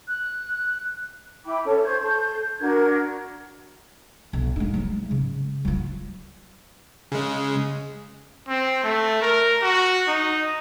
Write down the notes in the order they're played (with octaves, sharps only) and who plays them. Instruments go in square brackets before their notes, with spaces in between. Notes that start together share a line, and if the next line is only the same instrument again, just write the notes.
[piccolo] F#6
[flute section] E4 G5 B5 D6
C#4 A4 C#5
C5 C#6 G6 G#6
A4 G6
D4 F#4 A#4 G#6
[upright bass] B1
G#3 D#4
F#3 G#3
C#3
F#3 F4
[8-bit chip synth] C#3 G#3
[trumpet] C4
A3
A#4
F#4
D#4